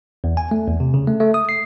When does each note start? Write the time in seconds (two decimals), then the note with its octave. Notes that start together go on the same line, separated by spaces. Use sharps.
0.24 E2
0.37 G#5
0.51 A3
0.68 E2
0.80 C3
0.94 C#3
1.07 A3
1.20 A3
1.34 D#6
1.49 C7